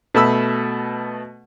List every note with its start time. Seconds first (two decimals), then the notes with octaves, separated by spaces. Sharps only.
0.14 B2 A3 A5 B5 E6